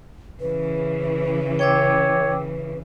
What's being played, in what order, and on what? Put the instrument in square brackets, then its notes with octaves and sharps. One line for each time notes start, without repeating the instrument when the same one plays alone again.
[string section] C#3 E3 [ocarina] B4
[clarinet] C#5 [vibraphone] G5 D6 E6